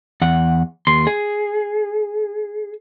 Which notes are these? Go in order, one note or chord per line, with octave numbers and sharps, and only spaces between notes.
E2 F#5
D#2 C6
G#4